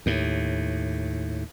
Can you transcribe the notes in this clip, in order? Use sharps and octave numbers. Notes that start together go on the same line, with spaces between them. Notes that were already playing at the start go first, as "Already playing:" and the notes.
D#2 A2